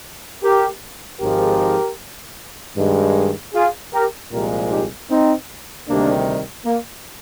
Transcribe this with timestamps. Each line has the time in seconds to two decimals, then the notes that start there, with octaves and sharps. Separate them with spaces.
0.43 G4 A#4
1.21 G#1 G#2 F3 G#3 G4 A#4
2.77 G2 D#3 G#3
3.54 F4 G#4
3.94 G4 A#4
4.32 C2 A#2 F3 G#3 G4 A#4
4.71 D#4 G4
5.10 C4 D#4
5.88 D2 C3 D#3 G3 A#3 D4
6.65 A#3